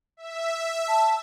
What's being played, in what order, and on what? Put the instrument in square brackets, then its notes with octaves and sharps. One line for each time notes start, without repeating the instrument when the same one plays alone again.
[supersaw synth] E5
[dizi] A5